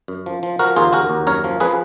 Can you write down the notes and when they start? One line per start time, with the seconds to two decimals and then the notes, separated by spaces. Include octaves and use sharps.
0.08 F#2
0.26 F3
0.43 F3
0.59 F3 F#4 A#4
0.76 D#2 F4 G#4
0.93 D#2 F#4 A#4
1.10 D#2
1.27 F#2 A#4 C#5
1.44 F3
1.60 F3 G#4 B4